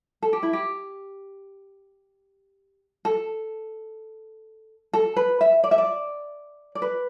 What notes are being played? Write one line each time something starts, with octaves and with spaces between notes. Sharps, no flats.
A4
G4
E4
G4
A4
A4
B4
E5
D5
E5
D5
D5
B4